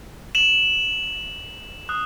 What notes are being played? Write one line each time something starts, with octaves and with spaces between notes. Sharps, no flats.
E7 F#7
D#6 F#6